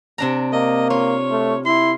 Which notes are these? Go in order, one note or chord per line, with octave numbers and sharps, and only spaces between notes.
C3 D4 A#5
A#3 D#5
F4 C#5
A3
E4 C6